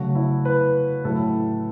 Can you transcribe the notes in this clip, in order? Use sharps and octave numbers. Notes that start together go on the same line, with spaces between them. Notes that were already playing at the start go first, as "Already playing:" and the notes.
Already playing: C#3 F#3 A3 F#4
E4
B4
A2 F#3 A3 A4